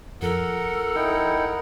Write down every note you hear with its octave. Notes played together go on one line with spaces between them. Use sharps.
F2 A4 A#4 F#5
D#4 E4 G5